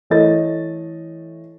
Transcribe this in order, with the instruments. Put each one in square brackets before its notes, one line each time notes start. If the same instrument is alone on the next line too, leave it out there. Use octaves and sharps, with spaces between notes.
[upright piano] E3 A3 A4 C#5 D#5 A6